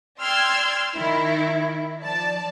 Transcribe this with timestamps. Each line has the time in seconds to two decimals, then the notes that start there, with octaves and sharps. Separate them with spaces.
0.20 D5 G5 C6 E6 F6 G#6
0.95 D#3 E4
2.01 F3 D5 A5